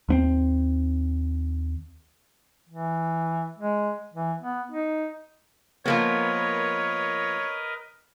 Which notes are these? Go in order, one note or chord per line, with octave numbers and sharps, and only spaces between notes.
D#2 B3 C4
E3
G#3
E3
B3
D#4
F3 A#3 B3 A#4 B4 C#5 D#5